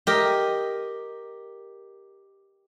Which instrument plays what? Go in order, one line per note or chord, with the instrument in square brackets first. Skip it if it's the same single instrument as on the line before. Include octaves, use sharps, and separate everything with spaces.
[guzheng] G4 A#4 D#5